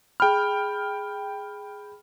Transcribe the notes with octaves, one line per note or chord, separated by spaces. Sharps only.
G#4 G5 B5 F6